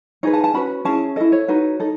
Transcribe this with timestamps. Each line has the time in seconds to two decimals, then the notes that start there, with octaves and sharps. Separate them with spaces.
0.23 D#4 G#4 B4 C#5
0.33 A5
0.44 A5
0.54 C#4 F#4 B4 B5
0.85 C#4 E4 G#4 A5
1.16 E4 A4 D#5
1.32 C#5
1.48 D#4 F#4 B4
1.80 D#4 A4